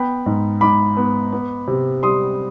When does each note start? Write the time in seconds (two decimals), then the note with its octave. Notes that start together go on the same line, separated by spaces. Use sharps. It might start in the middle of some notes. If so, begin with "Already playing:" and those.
Already playing: B3 G5 B5
0.26 G#2
0.61 G#2 B5 D6
0.97 B3
1.32 B3
1.67 C3
2.03 G3 C6 D#6